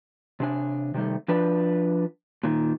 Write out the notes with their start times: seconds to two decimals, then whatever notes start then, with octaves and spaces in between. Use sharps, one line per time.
0.40 C3 D4 G#5
0.94 C3 D#3 G3 A3
1.28 F3 D4 B4
2.43 A#2 D#3